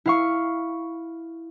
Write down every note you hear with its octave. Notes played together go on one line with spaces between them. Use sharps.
E4 F5 C#6